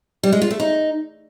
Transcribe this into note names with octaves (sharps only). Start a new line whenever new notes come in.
G3
G#3
F4
A3
D#4